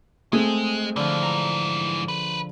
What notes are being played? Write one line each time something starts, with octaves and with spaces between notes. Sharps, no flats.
G#3 A3 C4 G#4
G#2 D3 E3 F3
A#5
A#4 B4